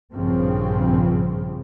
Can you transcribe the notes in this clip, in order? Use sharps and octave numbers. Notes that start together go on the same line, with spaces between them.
A#1 G2 C#3 F3 C4